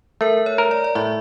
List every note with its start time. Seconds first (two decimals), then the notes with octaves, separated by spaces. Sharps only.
0.21 A3 A#4
0.46 C#5
0.58 A#4
0.71 D5
0.84 D5
0.95 A2 E5